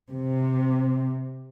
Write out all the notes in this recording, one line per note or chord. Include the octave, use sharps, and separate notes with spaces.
C3